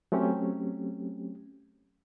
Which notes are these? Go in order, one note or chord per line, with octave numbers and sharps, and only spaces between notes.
F#3 A3 C4 C#4 G4